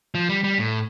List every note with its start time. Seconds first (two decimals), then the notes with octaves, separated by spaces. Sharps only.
0.15 F3
0.29 G3
0.44 G3
0.59 A2